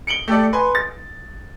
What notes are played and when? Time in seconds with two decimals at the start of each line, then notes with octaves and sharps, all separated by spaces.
0.07 C#7 D7 F#7 G7
0.28 A3 G4 A4 D5
0.53 B4 G#5 C6
0.75 A6